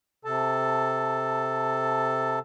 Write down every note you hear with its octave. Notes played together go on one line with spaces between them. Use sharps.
C3 A4 A5